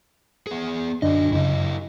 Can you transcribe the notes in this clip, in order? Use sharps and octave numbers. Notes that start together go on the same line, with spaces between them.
B3 G#4
F#2 D3 F#3 D4 D#5
F#2 C#3 E4 G4 D#5